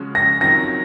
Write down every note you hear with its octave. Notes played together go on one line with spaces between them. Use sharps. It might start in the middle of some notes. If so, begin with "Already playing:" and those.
Already playing: C#3 F3 G#3 C#4 F#4
A#6
D#3 F#3 C4 F4 A#6